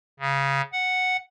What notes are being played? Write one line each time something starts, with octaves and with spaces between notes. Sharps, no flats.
C#3
F#5